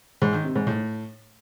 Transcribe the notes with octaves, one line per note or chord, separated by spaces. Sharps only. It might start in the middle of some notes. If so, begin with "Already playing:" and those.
G#2
D#3
C3
G#2
A2